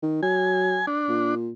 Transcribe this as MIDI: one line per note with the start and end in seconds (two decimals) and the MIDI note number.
0.03 0.18 51
0.23 0.81 54
0.23 0.86 80
0.87 1.35 62
1.09 1.51 46